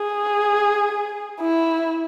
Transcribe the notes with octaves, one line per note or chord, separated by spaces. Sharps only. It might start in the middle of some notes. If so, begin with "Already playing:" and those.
Already playing: G#4
E4